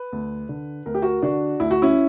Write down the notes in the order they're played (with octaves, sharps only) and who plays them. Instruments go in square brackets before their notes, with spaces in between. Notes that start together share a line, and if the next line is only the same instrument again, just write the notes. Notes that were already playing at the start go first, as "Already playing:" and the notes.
Already playing: [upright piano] B4
D2
D3
D2 A#4
G4
F#4 A#4
D3 D4 F#4
D2 E4
F#4
C#4 E4